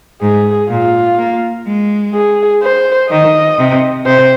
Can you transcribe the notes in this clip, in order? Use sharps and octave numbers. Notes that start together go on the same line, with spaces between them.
G#2 G#4
A#2 F4
A#3
G#3
G#4
C5
D#3 D#5
C3
C3 C5